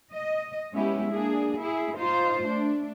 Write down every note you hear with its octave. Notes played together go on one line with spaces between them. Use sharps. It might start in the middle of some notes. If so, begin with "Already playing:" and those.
D#5
G#3 B3 C#4 E4 G4
A#3 D4 G#4
E4 G#4
D#4 F4 C5
A3 D4